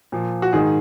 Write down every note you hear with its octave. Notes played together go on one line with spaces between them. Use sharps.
A#2 F3
F#4
G#2 D#3 G#4